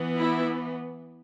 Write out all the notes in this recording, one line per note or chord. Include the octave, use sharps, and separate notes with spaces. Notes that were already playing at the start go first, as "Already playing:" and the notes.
Already playing: E3 B3
E4